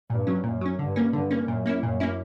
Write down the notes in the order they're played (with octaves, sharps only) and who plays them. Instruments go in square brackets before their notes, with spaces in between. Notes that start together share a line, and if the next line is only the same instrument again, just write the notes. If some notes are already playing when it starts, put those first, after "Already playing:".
[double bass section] G2 [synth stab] A#2
[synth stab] F#3 C#4
[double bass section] F#2 [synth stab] A#2
[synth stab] F#3 C#4
[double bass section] G2 [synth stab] D3
[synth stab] A#3 C#4
[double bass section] G2 [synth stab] D3
[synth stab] A#3 C#4
[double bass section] F#2 [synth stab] A#2
[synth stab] A#3 C#4 E4
[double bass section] F#2 [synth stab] A#2
[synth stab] A#3 C#4 E4